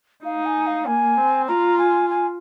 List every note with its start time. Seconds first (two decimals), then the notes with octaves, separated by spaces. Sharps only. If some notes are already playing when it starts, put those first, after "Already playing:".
0.25 D#4 F5
0.46 G#5
0.67 F5
0.87 A#3 G#5
1.17 C4
1.48 F4 A#5
1.79 G#5
2.10 G#5